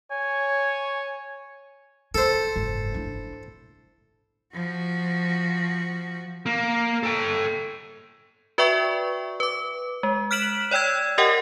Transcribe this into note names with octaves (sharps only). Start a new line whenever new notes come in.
C#5 G#5
F4 A4 C5
F#1 G#2
D4 E4
F3 F#4
A#3
A4 G5
F#4 B4 D5 E5 G5 C#6
B4 D6
G#3
F6 F#6 B6 D7 E7 F#7
C#5 D5 G5 E6 G#6
G4 A#4 D#5 F#5 G5